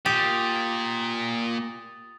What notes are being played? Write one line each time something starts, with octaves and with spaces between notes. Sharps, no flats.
A#2 G4 D#6 A6 F7